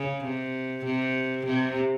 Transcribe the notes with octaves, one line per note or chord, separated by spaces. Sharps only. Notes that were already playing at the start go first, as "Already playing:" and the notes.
Already playing: C#3
C3
C3
C3